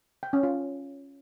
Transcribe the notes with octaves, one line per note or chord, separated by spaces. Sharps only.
G5
C#4
F4